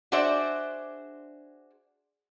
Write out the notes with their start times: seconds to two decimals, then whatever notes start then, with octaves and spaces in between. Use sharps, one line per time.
0.12 D4 F#4 G#4 C5 D5 E5